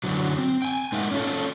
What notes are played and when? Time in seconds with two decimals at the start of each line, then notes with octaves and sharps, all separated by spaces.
0.04 F#2 D3 F#3
0.38 C4
0.62 G5 G#5
0.92 G#2 G#3 D#4 A#4 E5 F#5
1.12 C#4 F4 A4